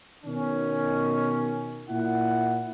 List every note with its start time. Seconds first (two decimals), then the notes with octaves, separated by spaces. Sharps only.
0.24 B2 D#3 C#4
1.88 A#2 E4 F#5